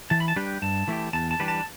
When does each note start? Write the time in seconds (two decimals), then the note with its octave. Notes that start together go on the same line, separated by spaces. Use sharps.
0.10 E3 A5
0.20 B5
0.28 A5
0.36 G3 D4 G4 B4 G5
0.62 G2 A5
0.88 E3 A3 E4 G4
1.13 E2 A5
1.31 A5
1.40 E3 G3 D4 B4
1.48 A5